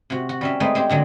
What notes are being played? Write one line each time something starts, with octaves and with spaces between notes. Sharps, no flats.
C3 F#4
F#4
G3 C#4 E5
G#3 A3 C4 D#4 B4
G#3 C4 G4
A#2 D3 F#3 G#3